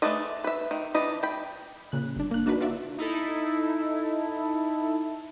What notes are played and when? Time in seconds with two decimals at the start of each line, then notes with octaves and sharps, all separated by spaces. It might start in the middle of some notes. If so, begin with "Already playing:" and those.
0.02 A3 G#4 B4 D5 D#5
0.44 B4 E5
0.71 D#3
0.94 E3 D4 D#5 B5
1.23 G5 B5
1.92 A#2 C#3 F#6
2.16 G1 D4
2.31 A#3 F#6
2.46 A#3 D4 D#4 F#4 B4
2.60 F4 F#4 D5 E5
2.98 D#4 E4 A4